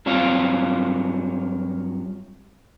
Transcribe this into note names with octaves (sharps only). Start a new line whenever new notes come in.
G2 F#3 C4 F4 F5